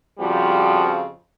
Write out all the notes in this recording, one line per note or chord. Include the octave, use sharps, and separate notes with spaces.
F2 C#3 F3 G3 F#4